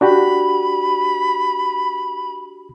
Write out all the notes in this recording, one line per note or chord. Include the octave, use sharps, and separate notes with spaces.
D4 F#4 G4 B5